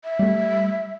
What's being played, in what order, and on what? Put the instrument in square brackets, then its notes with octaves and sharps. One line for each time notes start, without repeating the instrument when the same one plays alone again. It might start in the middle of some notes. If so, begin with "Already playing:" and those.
[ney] E5
[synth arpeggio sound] G3 A3